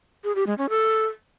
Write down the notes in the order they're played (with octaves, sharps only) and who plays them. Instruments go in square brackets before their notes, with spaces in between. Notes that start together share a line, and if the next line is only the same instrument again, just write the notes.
[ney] G#4
G4
G#3
C#4
A4